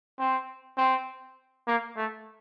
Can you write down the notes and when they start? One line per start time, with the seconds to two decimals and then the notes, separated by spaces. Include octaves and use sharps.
0.19 C4
0.78 C4
1.67 A#3
1.97 A3